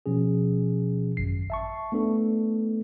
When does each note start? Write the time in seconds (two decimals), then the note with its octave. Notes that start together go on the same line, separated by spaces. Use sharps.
0.06 B2 F3 C#4 G#4
1.17 G#1 F#2 C7
1.50 E5 A5 C#6
1.92 A3 B3 D4 A4